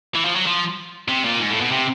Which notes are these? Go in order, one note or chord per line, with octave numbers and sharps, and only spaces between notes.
E3
F3
F#3
F3
C3
A#2
G#2
A2
B2
C3